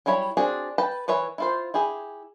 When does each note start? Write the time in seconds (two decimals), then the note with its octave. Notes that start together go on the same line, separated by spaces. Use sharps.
0.06 F#3 G3 E4 C#5 B5
0.37 C4 D4 F#4 G#4
0.78 B4 G5 A5 B5
1.08 E3 B4 C#5 E5
1.38 E4 F4 C5
1.74 E4 G4 G#4